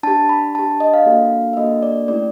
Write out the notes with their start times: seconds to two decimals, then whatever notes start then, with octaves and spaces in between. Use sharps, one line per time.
0.03 D4 G4 A5
0.29 B5
0.55 D4 G4 A5
0.80 D#5
0.94 F5
1.06 A#3 D4 F#4 A4
1.53 E5
1.57 A#3 D4 F#4 A4 D#5
1.83 D5
2.08 A3 C#4 E4 G4 D5